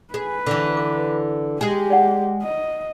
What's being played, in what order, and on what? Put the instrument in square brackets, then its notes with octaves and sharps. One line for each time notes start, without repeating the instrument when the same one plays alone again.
[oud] G#4 [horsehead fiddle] B4
[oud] D3 E3
[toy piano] D6
[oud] G#3 G#4 [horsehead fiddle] G4
[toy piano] D5 F#5
[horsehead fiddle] D#5